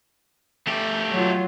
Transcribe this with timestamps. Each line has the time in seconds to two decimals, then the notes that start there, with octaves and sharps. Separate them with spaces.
0.67 A3 G4
1.12 F#3 F4